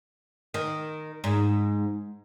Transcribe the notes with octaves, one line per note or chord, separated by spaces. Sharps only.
D#3
G#2